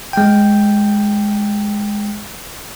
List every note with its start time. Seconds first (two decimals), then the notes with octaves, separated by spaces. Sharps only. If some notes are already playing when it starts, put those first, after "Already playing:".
0.13 G#3 G5